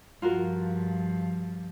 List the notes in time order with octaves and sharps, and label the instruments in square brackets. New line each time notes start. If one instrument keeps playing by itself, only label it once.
[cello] G2 F3 [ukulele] F4 F#4 A#4